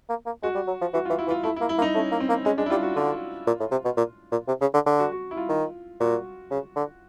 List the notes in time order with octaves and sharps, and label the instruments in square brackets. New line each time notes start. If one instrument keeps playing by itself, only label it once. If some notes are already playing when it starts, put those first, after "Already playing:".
[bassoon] A#3
A#3
[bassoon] G#3 [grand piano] F#4
[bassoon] G3
F#3
F3
[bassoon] E3 [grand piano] F#4
[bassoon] E3 [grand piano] F4
[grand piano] E4
[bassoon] E3
[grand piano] F4
[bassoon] A3 [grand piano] E4
[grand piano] E4
[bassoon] A#3
[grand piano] E4
[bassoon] A#3
[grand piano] D#4
[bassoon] A3 [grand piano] C#4
[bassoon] A#3
[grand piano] C4
[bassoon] A#3
[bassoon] G#3 [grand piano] C#4
[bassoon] G#3 [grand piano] D4
[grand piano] E4
[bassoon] G3 [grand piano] F4
[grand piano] F#4
[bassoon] D3 [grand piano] F4
[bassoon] A#2
A2
C3
B2
A#2
A#2
C3
C#3
D3
D3
[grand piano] F#4
F#4
E4
F4
[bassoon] D#3
[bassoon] A#2 [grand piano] F#4
[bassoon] C#3
D3